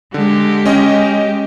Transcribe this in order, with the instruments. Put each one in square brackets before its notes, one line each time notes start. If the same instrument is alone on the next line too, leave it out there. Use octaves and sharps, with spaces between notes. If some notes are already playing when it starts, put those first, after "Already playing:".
[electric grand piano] D3 [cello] G#3 G4
[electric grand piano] C#4 D#5 G5